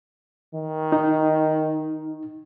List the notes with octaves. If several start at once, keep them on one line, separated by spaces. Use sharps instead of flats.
D#3
D#4